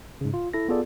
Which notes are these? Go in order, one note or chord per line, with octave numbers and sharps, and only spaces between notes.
G#2 C#3
F4
E4 A4 A#6
B3 F4 G#4 A4 D5